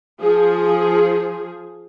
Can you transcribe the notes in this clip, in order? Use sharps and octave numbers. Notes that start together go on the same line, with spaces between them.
F3 G#4